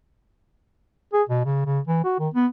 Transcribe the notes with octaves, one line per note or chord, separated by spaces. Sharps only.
G#4
B2
C#3
C#3
E3
F#4
D#3
B3